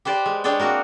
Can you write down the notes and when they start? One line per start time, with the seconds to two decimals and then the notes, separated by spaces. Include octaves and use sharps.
0.05 G4 B4 C5 D5
0.26 G#3
0.44 G#3 D4 G#4 C#5 D5 G5
0.60 A#3 C4 F#4 A#4